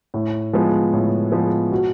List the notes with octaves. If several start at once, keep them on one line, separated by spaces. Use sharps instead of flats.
A2
F3 G#3 B3
A2
F3 G#3 B3
B2